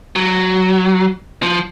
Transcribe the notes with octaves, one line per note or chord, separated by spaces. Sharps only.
F#3
F3